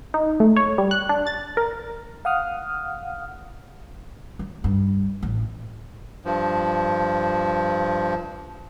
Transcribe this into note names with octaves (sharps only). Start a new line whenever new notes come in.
D#4
A3
C#5
G3
F#6
D4
A6
A#4
F5 F#5 D#6 F6
F#3
G2
A1
G2 F3